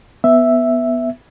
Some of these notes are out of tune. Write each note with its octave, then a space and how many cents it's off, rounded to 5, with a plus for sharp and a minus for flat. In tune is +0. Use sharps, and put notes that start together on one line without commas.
B3 +0 E5 +0